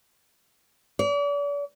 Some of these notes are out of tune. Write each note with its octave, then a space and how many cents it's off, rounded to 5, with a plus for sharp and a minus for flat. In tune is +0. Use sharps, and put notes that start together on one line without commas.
D5 -40